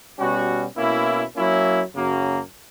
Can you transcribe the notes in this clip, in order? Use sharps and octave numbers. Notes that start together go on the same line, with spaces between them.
B2 G3 C#4 F#4
B2 A#3 C#4 E4
F#3 A#3 C#4 E4
F#2 C#3 F#3 A#3